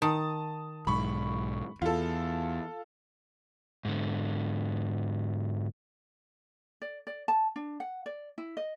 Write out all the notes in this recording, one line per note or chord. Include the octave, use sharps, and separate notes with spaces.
D#3 A5 D#6
B1 G#2 B5 C#6
E2 F4 A4
G#2 D3
D5
D5
A5
D4
F#5
D5
E4
D#5